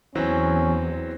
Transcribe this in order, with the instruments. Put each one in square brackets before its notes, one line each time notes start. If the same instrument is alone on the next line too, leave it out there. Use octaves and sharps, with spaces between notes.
[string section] E2 [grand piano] E3 F#3 C4 [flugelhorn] C#4